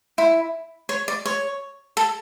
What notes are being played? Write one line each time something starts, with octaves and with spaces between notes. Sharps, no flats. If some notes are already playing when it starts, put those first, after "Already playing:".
E4
C#5
D5
C#5
A4